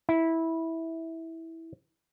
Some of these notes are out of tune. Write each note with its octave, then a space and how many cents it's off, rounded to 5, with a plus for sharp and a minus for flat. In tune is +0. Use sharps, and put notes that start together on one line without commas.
E4 -15